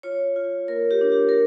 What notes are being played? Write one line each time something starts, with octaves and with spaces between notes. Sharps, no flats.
F4 C#5
F4
A#3 A#4
G4
D4
G4
A#4